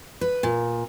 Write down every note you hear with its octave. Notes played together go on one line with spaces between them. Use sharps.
B4
A#2